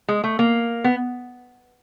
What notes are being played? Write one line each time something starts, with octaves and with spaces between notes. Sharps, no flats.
G#3
A3
A#3
B3